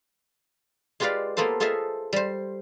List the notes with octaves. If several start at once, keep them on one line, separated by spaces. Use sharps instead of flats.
G#3 F4 G4 B4 D5 F5
A#3 B3 F4 A4 C5
F4 G#4 A4 C5 D#5 E5
G3 C5